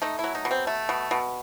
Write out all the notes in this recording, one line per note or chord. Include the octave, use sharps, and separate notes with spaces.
A3 D#4
F#3 E4
D#4
B2
C4
A3
B2
B2